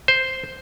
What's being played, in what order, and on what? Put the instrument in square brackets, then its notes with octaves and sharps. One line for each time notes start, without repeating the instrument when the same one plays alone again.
[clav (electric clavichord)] C5